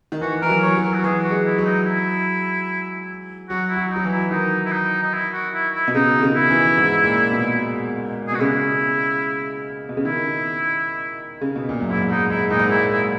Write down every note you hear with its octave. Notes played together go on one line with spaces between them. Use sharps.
D#3
E3 F#4
E3 A#4
F#3
E3 C#5
F#3
A#4
F#4
E3 G#4
F#4
G#3
E4
F#3
D#4
E4
F#3 F#4
E4
F#3
D#4
F#3
E3
E4
D#3 D#4
E4
D#4
D#4
E4
F#4
E4
E4
B2
C#3 D#4
D#3
C#3
E4
E3
G#2
A#2
B2
G#4
B2 F#4
C#3 E4
B2
C#3
D#3 E4
C#3
B2
A#2
F#2
G#2 E4
G#2 D#4
G#2 E4
A#2 D#4
G#2
A#2 E4
E4